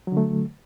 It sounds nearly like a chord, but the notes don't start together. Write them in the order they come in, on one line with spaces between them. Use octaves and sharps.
F#3 D3 A3